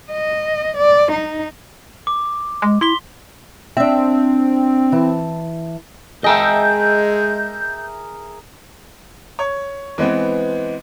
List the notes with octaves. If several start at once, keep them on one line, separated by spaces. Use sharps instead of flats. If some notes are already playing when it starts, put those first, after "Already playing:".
D#5
D5
D#4
D6
G#3
E4 C6 B6 G7
C4 D4 E5
E3 A5
G#3 G#4 A#4 D#5 E5 G5 A5 G6
C#5
E3 G#3 B3 C4